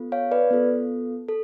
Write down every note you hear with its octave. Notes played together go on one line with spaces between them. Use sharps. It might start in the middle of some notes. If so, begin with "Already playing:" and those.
Already playing: B3 F4 A4
C#5 F5
B4 D5
B3 F4 A4
A4